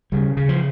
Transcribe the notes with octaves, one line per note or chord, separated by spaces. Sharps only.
C#3 G3
C#3
F3